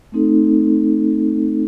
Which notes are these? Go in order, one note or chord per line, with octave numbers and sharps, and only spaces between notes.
A3 C4 D#4 A4